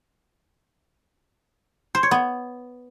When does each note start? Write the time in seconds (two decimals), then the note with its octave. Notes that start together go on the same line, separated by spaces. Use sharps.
1.95 C5
2.03 C#5
2.11 B3